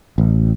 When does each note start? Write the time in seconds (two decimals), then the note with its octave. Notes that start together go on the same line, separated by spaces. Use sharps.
0.18 A1